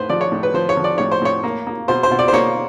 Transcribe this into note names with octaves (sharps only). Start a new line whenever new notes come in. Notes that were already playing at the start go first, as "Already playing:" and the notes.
Already playing: A2 B4 C5
F3 D5
C#5
A2
B4
F3 C5
C#5
F3
D5
A2 C#5
C5
A2 C#5
A#3
A#3
B2 C5
C5
B2
D5
C5
A#3 C#5